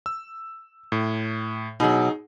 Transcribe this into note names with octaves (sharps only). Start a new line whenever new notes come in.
E6
A2
B2 F#3 D#4 G#4